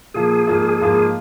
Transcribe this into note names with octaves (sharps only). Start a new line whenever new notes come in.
A#2 F3 A#3 G#4
G#2 F3 A#3 F4
G#2 F3 A#3 F4